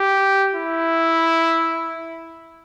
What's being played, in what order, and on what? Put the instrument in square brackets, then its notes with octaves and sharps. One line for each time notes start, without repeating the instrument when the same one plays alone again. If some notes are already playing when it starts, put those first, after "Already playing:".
Already playing: [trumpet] G4
E4